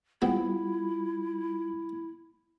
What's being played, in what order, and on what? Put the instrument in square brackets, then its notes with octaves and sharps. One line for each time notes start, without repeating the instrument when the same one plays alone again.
[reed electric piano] G3 F4 [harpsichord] G#3 B3 C4 [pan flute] E4